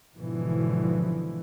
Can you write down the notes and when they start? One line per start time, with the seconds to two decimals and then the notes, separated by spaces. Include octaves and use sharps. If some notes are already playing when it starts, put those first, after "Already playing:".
0.16 G#1 B2 D3 E3 F3